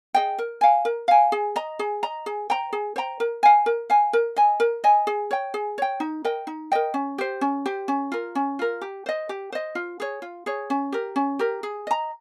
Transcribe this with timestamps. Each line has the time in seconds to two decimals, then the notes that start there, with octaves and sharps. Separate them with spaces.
0.14 G#4 D#5 G5
0.39 A#4
0.61 F5 G#5
0.85 A#4
1.08 F5 G#5
1.32 G#4
1.56 D#5 A#5
1.79 G#4
2.03 D#5 A#5
2.26 G#4
2.50 C5 G5 A#5
2.73 G#4
2.96 C5 G5 A#5
3.20 A#4
3.43 F5 G#5
3.66 A#4
3.90 F5 G#5
4.13 A#4
4.36 D#5 G#5
4.60 A#4
4.84 D#5 G#5
5.07 G#4
5.31 C#5 G5
5.54 G#4
5.78 C#5 G5
6.00 D#4
6.25 A#4 D#5 G5
6.47 D#4
6.72 A#4 D#5 G5
6.94 C#4
7.18 G4 C5
7.41 C#4
7.66 G4 C5
7.88 C#4
8.12 F4 A#4
8.35 C#4
8.59 F4 A#4
8.81 G4
9.06 C5 D#5
9.29 G4
9.52 C5 D#5
9.75 F4
10.00 G#4 C#5
10.22 F4
10.46 G#4 C#5
10.70 C#4
10.92 G4 A#4
11.16 C#4
11.39 G4 A#4
11.63 G#4
11.87 D#5 A#5